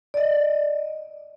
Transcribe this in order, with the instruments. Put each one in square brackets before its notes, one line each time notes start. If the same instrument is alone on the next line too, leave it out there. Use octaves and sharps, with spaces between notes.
[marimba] D5 D#5